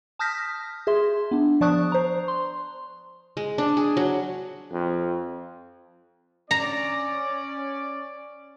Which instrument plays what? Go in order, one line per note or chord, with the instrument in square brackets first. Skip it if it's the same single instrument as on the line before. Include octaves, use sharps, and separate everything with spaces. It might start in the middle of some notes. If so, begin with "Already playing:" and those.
[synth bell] A5 D#6 F6 G6 A#6 B6
G#4 E5 C6
B3 D4
F3 D5 A5 C#6 D#6 F#6
C5 A#5
C6
[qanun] G#3
D4
G#4
F#3
[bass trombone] F2
[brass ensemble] C#4 D5 [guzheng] A#5